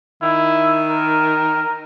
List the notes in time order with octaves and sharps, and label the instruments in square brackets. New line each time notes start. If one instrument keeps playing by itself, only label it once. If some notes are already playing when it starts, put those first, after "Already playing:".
[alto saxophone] D#3 [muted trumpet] E4
[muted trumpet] A#4